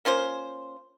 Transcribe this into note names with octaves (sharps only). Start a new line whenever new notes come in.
A#3 C#4 F4 C5